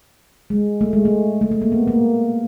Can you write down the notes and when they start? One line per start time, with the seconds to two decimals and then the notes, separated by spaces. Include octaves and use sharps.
0.50 G#3
0.81 A3
0.93 G#3
1.05 A3
1.41 A3
1.51 A3
1.62 A#3
1.72 B3
1.88 A#3